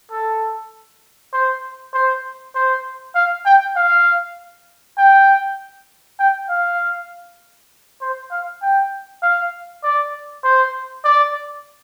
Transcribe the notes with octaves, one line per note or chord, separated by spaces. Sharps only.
A4
C5
C5
C5
F5
G5
F5
G5
G5
F5
C5
F5
G5
F5
D5
C5
D5